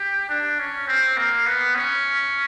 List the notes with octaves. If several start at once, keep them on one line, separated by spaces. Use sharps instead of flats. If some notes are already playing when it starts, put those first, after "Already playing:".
Already playing: G4
D4
C#4
C4
A#3
B3
C#4